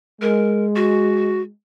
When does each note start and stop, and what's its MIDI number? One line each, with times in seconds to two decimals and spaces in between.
0.22 1.50 56
0.22 0.65 70
0.76 1.41 66